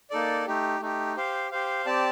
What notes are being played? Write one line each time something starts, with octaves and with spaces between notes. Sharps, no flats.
A#3 D#4 A4 D5
A3 D#4 G4
A3 D#4 G4
G4 C5 F5
G4 C5 F5
C4 G4 D5 A5